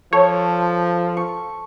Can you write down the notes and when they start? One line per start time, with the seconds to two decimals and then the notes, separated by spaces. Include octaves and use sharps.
0.13 F3 A4 C#5
1.17 C#6